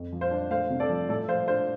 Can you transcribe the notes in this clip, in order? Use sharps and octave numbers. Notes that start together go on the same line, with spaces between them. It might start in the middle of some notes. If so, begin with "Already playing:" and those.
Already playing: F2
F3
C5 F5
D4
A3 C5 F5
C3
A4 D5
F3
A2 A4 D5
F3 C5 F5
D4 C5 F5